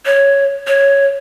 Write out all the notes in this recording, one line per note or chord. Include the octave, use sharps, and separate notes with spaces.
C#5
C#5